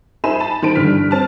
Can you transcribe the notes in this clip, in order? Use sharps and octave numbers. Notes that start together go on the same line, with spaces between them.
D#4 C5 E5 G#5 B5 E7
A5 B5
D#3 C5 D7
G2 D3 E3 F6 B6
C4 A5 F6